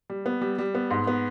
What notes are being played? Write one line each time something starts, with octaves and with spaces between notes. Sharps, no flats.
G3
B3
G3
G3
B3
G#2
B3